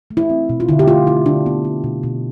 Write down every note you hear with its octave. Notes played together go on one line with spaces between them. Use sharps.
A3
E4
C4
B2
F4
D3 E4
G4
A3 F4
C4 E4
D3 D4
B3
B3
B2
B2